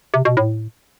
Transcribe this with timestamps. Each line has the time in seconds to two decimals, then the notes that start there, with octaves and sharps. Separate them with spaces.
0.14 C3
0.25 B2
0.37 A2